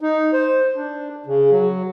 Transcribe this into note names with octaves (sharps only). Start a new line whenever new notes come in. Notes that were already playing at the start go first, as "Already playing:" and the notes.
D#4
C5
D4
C#3
F#3